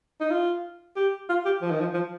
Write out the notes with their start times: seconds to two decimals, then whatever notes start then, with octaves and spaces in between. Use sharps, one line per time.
0.21 D#4
0.31 F4
0.96 G4
1.29 F4
1.45 G4
1.62 F3
1.71 D#3
1.81 F3
1.94 F3